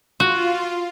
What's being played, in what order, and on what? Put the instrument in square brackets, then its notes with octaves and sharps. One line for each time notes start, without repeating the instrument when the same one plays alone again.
[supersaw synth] F4 [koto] F#4